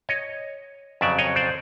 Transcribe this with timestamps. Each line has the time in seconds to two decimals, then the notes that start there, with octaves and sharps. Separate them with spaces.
0.09 C#5 D#5
1.01 F2 C#3 F#3 D5 E5
1.19 C#5 D#5
1.36 C5 D5